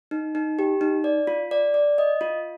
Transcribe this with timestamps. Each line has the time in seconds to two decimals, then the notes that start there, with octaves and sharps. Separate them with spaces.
0.11 D#4
0.35 D#4
0.59 G4
0.81 D#4
1.04 D5
1.27 F4
1.51 D5
1.74 D5
1.98 D#5
2.21 F4